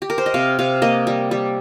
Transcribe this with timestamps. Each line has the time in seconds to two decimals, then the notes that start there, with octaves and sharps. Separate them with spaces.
0.02 G4
0.10 A#4
0.18 C5
0.26 D#5
0.34 C3 F5
0.59 C3 F5
0.82 A#3 D#5
1.07 G3
1.31 G3